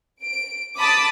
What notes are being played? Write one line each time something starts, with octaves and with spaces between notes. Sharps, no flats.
D7
A5 B5 D6 D#6 B6